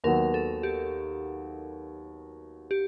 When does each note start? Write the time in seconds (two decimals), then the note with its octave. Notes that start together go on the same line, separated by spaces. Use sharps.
0.04 D#2 D#3 F#3 B3 A#4
0.34 A4
0.63 G4
2.71 G4